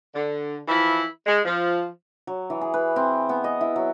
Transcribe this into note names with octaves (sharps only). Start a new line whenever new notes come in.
D3
E3 F3 E4
G#3
F3
F#3
E3
G#4
B4
C4
B3
D#5
E4
F#3